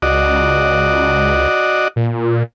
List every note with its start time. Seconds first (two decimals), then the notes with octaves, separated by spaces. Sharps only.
0.02 C#2 F#4 D5 D#5
1.96 A#2